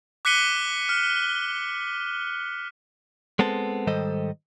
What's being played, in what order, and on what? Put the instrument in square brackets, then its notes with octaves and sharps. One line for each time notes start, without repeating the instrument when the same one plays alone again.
[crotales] D6 F#6 B6 C#7 D#7 G7
F6
[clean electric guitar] G#3 B3 C4 A4
G#2 D#3 G3 A4 C5 D#5